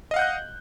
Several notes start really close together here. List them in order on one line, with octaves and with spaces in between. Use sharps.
D#5 F5 F#5 G6 F#6